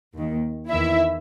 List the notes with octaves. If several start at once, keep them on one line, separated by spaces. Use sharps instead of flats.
D#2 D#3
E2 D#3 E4 E5